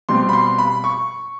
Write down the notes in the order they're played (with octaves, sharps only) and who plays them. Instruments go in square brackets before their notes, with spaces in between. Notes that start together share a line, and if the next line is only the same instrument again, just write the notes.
[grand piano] B2 G3 C4 C6
B5
C6
B5
C#6